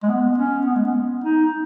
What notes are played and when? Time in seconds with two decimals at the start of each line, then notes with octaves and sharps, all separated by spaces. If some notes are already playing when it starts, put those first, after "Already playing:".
0.03 G#3
0.09 B3
0.38 C#4
0.66 B3
0.76 G#3
0.84 B3
1.24 D#4